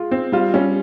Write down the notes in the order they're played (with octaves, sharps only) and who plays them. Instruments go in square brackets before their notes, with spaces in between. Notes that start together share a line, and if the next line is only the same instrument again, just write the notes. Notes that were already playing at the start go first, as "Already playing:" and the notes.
Already playing: [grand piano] G#3 [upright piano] F4
[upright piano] C4
[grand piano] G3 [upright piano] F4
[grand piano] G3 [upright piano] C#4